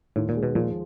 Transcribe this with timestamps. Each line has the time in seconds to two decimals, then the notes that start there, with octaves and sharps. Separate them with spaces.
0.16 D#2 A2
0.29 A#2
0.36 G#3
0.43 B2
0.55 A#2 F3